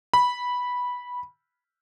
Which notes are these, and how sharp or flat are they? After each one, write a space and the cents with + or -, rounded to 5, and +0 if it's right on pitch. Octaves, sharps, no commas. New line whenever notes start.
B5 -10